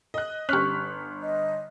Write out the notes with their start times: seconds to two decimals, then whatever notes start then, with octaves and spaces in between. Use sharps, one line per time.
0.14 D#5 F#6
0.49 G1 C#4 G4 C#6 F6 F#6 B6
1.22 D#5